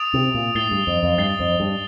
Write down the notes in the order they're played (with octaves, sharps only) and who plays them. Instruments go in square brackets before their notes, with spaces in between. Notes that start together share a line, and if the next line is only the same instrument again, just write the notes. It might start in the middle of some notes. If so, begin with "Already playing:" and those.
Already playing: [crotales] D#6 A6 D7 F7
[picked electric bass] C3
A#2
[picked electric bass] A2 [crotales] A6 C7 G7
[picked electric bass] G2
F2
F2
[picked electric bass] G2 [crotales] A6 C7 G7
[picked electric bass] F2
G2